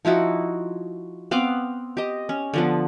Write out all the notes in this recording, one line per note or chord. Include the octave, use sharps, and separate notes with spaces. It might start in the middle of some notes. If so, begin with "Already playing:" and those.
F3 D#4 E4 F#4
B3 C4 F5 D6
G4 D#5
C#4
D3 F3 B3